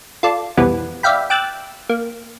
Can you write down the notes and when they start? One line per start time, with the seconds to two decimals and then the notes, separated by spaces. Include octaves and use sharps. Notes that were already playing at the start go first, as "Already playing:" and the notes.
0.23 F4 A4 D5
0.57 C2 F2 B2 E3 G3 B3
1.03 D5 E5 F5 G5 B5
1.30 G5 D6 E6 F#6 A6
1.90 A#3